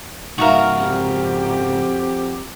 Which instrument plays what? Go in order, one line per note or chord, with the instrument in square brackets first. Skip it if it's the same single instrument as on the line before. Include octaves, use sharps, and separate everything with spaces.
[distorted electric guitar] C#2 G#2 [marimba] D#4 E5 F5 [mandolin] F#4 A#4
[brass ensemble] F2 C4 G4